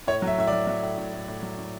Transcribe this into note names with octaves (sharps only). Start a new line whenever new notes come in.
A2 C#5
F#3
E5
A2 E5
D5
F#3
F#3 E5
A2
A2
A2
A2
F#3
A2